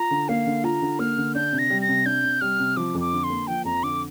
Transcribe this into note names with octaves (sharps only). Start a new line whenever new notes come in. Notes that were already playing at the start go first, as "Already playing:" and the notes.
Already playing: F4 A#5
D3
A#3 F5
D3
F4 A#5
D3
A#3 F6
D3
D4 G6
C3
A#6
G3
A#6
C3
D4 G6
C3
G3 F6
C3
F3 D6
F2
D6
D3
C6
A#3
F3 G5
F2 A#5
D3 D6